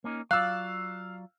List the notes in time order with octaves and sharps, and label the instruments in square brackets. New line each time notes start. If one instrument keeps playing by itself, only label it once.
[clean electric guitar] A#3 C#4 D#4
[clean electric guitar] F#3 F4 D5 [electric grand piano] F5 E6 [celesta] F#6